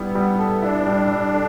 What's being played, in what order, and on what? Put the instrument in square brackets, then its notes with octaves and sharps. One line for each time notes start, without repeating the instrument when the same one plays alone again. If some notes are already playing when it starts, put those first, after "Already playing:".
Already playing: [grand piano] G3 E4 [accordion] B3
[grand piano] G3
A4
[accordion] D4 [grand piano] E4
[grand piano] G3
G3
A4